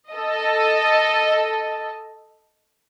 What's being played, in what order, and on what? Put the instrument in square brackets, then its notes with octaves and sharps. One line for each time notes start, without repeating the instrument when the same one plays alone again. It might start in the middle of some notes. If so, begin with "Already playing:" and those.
[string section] A4 D#5